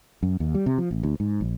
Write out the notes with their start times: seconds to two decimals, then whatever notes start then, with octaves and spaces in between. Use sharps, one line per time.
0.23 F#2
0.40 D#2
0.55 G3
0.66 C3
0.78 F3
0.91 A1
1.03 D2
1.20 G#2
1.41 A#1